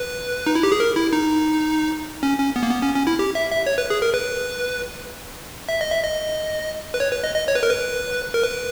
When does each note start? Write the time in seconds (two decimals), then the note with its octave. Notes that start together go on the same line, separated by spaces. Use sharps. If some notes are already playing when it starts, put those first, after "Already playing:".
Already playing: B4
0.47 D#4
0.55 E4
0.63 G4
0.72 G#4
0.80 A#4
0.96 E4
1.13 D#4
2.23 C#4
2.39 C#4
2.56 B3
2.63 A#3
2.71 B3
2.82 C#4
2.95 C#4
3.07 E4
3.19 G4
3.35 E5
3.51 E5
3.66 C#5
3.78 B4
3.90 G#4
4.02 A#4
4.14 B4
5.69 E5
5.81 D#5
5.92 E5
6.04 D#5
6.94 B4
7.00 C#5
7.12 B4
7.24 D#5
7.35 D#5
7.48 C#5
7.55 B4
7.63 A#4
7.70 B4
8.34 A#4
8.43 B4